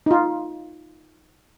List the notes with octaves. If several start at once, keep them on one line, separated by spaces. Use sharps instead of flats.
D#4 F4